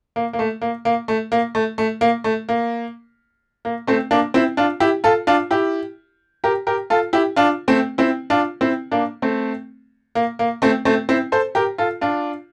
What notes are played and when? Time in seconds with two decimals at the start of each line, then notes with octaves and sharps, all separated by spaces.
0.16 A#3
0.33 A#3
0.39 A3
0.62 A#3
0.85 A#3
1.08 A3
1.32 A#3
1.55 A3
1.78 A3
2.01 A#3
2.24 A3
2.49 A#3
3.65 A#3
3.87 A3 C4
4.11 A#3 D4
4.34 C4 E4
4.57 D4 F4
4.80 E4 G4
5.04 F4 A4
5.27 D4 F4
5.51 E4 G4
6.44 G4 A#4
6.67 G4 A#4
6.90 F4 A4
7.13 E4 G4
7.36 D4 F4
7.68 A3 C4
7.98 C4 E4
8.30 D4 F4
8.61 C4 E4
8.91 A#3 D4
9.22 A3 C4
10.15 A#3
10.39 A#3
10.62 A3 C4
10.85 A3 C4
11.09 C4 E4
11.32 A4 C5
11.55 G4 A#4
11.78 F4 A4
12.01 D4 F4